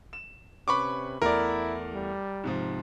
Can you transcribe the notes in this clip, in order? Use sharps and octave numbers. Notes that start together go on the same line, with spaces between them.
E7
C3 C#4 B4 B5 C#6 D6
E2 A3 E4 A#4 D5
G3
G#2 C3 F3